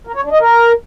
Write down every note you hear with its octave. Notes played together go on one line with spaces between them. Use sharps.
A#4
C#5
D4
D#5
A#4